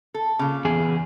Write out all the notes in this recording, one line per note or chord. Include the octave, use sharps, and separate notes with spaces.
A4
A#2 C#3
E2 G#4